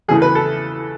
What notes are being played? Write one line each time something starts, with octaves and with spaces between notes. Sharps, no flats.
E2 C#3 E3 A3 G#4
B4
A4